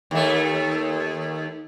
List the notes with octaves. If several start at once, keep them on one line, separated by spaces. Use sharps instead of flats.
D#2 A3